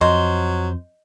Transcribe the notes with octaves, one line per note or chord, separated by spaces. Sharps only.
F2 F#3 C5 D#5